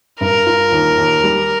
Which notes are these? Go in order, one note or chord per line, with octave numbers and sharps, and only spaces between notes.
G2 A#4
F4
D#2
D#2
G3